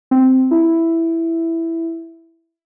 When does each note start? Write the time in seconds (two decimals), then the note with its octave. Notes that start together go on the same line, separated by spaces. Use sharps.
0.11 C4
0.51 E4